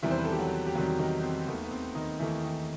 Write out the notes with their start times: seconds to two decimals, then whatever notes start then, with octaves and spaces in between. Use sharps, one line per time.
0.03 E2 C3 D#3 E3 G3 E4
0.11 C5
0.18 B4
0.25 A4
0.32 G4
0.39 F#3 F#4
0.67 G4
0.75 E2 C3 D#3 F#3 G3 F#4
0.99 D#3 D#4
1.23 C4
1.47 D#2 D#3 A3 B3
1.63 B3
1.71 C4
1.95 D#3 D#4
2.19 D#2 D#3 E3 A3 E4
2.44 D#3 D#4